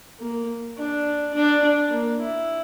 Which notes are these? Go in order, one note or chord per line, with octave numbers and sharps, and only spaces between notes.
A#3
D4
D4
D4
A#3
E4